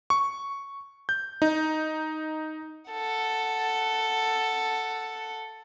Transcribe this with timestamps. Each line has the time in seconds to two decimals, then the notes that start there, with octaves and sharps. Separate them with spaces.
0.10 C#6
1.09 G6
1.42 D#4
2.91 A4 F#5